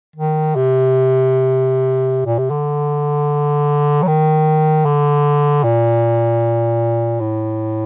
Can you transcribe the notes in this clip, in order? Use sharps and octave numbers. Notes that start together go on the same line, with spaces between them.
D#3
C3
A#2
C3
D3
F#3
D#3
D3
A#2
A2